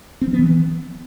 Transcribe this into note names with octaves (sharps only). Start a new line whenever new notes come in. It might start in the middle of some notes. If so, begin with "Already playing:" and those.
C4
F3
B3
E3